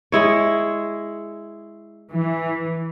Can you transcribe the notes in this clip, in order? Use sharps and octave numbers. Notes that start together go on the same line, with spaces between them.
G#3 E4 C#5
E3